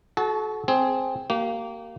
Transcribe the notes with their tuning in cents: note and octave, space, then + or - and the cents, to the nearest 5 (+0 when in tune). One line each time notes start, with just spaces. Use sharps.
F#4 +0 A4 -40 A5 -10
C4 +0 G#4 +15
A#3 -15 G4 -35